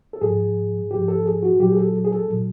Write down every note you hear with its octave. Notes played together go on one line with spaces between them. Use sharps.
A4
G#2 F3 G#4
G#2 F3 G4
A4
G#4
F#4
A#2 F#3 G4
G#4
A4
G#4
A4
A#2 F#3